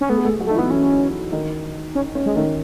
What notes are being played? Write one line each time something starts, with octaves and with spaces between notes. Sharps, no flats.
C#4
A3 B3 A4
G#4
A3 A4
F#3 F#4
A3 D#4
E3 B3 E4
E3 C#4 E4
D#3 D#4
C#4
C#4
G#3
D#3 A3 D#4